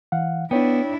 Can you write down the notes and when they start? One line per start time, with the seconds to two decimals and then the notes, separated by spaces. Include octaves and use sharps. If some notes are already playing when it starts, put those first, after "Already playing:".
0.12 E3 F5 F#5
0.51 B3 D4 E4 C#5 G5